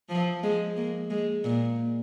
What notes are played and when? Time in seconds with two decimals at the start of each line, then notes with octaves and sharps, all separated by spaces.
0.09 F3
0.43 G#3
0.76 A#3
1.10 G#3
1.44 A#2